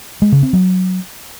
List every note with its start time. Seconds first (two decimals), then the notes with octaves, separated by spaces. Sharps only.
0.22 G#3
0.32 C#3
0.43 C4
0.53 F#3